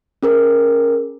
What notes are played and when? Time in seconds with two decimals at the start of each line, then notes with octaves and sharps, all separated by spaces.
0.23 C#4 G#4 A#4